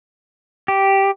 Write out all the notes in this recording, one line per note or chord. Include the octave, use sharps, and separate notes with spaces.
G4